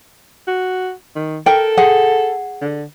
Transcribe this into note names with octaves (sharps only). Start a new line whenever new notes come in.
F#4
D#3
A4 A#4 G5
G#4 F#5
D3